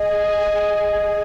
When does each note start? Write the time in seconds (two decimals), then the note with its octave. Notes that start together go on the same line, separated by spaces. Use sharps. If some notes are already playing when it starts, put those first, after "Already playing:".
Already playing: G#4 D#5 G#5
0.30 G#4 G#5